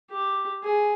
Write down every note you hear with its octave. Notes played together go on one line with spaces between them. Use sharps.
G4
G#4